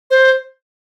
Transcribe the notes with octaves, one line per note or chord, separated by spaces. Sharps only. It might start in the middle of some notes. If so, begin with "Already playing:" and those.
C5